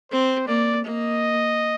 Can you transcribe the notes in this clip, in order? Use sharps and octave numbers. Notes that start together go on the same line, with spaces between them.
C4 C5
A#3 D5
A#3 D#5